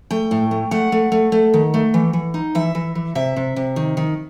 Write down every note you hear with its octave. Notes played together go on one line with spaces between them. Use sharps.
A3 G5
A2
A3
A3 F#5
A3
A3
A3
D#3
A3
E3
E3
D#4
E3 E5
E3
E3
C3 E5
C3
C3
D#3
D#3